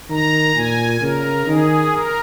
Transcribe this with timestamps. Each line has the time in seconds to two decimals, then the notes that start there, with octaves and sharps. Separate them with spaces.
0.10 D#3 A#5
0.55 A#2 G#5
1.01 C#3 A#4
1.47 D#3 G#4
1.92 A#4